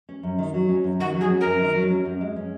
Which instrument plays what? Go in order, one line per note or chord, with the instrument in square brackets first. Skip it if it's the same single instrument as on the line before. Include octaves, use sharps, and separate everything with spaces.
[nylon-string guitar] C#4
F#2
D#3
F#3
C#4
F#2
[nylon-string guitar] D#3 [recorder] F#4
[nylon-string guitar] F#3
[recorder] G#4
[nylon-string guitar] C#4
[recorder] A#4
[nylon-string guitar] F#2
D#3
F#3
C#4
F#2
G#3
C#4